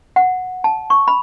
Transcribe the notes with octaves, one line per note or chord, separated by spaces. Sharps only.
F#5
A5
C#6
B5